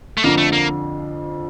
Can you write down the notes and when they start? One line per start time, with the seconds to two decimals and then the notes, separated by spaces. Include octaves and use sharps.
0.18 A3
0.23 F2 D3 F3 A#3
0.38 A3
0.53 A#3